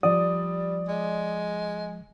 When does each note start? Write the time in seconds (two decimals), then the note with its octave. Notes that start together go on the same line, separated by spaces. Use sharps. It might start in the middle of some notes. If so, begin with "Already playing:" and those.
0.03 F3 G3 D5 D#6
0.88 G#3